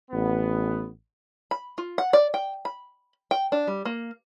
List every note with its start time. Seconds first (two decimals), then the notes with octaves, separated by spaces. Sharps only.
0.11 A1 B3
1.51 B5
1.78 F4
1.98 F#5
2.13 D5
2.34 G5
2.65 B5
3.31 G5
3.52 D4
3.67 G3
3.85 A#3